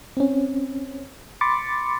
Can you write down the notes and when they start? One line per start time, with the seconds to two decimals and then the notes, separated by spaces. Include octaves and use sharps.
0.17 C4 C#4
1.41 B5 C6 D6 A6 C#7